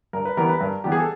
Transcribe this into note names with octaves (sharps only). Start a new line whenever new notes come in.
G2 A#4
B4
E3 G3 B3 A#4
B4
G2 A#4
E3 G3 B3 G4
G#4
A4